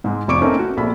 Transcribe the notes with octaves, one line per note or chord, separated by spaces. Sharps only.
G#2 G#3
F1 F2 C#6 D6 D7
A3 A#3 C4 C#4 D#4
F#4
A#1 A3 B5